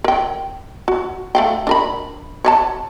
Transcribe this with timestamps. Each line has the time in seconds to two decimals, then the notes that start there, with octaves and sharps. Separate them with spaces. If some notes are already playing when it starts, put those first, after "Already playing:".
0.04 A#4 G5
0.88 F#4
1.35 A3 F5 G5
1.67 D4 A#4 B5
2.45 C#5 D5 A5